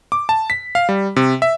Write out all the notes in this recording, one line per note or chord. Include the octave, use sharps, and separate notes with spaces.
D6
A5
B6
F5
G3
C3
E5